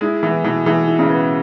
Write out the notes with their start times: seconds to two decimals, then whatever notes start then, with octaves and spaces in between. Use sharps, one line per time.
0.01 G#3 E4
0.23 E3 B3
0.44 B2 E3
0.66 E3 G#4
0.88 E4
0.99 C#3
1.10 B3